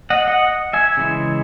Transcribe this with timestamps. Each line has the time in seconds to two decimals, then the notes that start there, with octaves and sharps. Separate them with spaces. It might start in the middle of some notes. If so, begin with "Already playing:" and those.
0.10 D#5 F#5
0.28 D#5 F#5
0.73 E5 G#5
0.97 C#3 E3 G#3